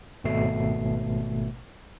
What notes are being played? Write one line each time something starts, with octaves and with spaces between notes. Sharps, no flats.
G#1 B2 A3 C7